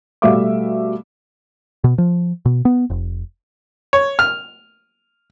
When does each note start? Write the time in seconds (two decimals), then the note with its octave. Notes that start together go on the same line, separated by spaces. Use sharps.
0.22 B2 G3 A3 E5 F5 D6
1.84 B2
1.98 F3
2.46 B2
2.65 B3
2.90 F1
3.93 C#5
4.19 F6